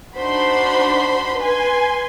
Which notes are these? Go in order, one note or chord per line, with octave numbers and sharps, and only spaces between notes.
D4 D#4 F#4 C5 B5 C6
B4 G#5 C6